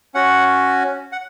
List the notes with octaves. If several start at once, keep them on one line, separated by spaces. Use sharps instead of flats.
C#4 F#4 F#5
F#5